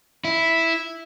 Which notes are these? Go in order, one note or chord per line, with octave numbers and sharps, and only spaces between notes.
E4